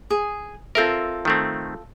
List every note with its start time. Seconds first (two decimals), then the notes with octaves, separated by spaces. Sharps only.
0.10 G#4
0.75 C4 F4 A4 A#4 E5
1.25 D#3 A3 C4